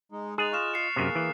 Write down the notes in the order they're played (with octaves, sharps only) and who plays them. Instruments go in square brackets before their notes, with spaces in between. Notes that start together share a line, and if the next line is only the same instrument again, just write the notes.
[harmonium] G#3 D#4
[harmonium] G#3 D#4 [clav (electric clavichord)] G#4 [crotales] F#6 A6 F7
[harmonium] F4 D#5 [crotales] C#6 F6 E7
[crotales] C7 C#7
[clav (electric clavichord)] F#2 C3 [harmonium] A#3 G#4
[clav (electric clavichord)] E3